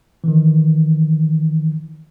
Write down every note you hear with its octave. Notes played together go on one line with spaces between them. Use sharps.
D#3 E3